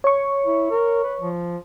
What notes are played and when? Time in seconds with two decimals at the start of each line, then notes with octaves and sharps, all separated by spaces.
0.04 C#5 C#6
0.46 E4
0.71 A#4
1.04 B4
1.21 F3